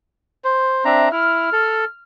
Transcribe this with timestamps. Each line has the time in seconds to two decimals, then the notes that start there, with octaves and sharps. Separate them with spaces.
0.44 C5
0.85 C4 D4 E5 A#5
1.12 E4 F6
1.53 A4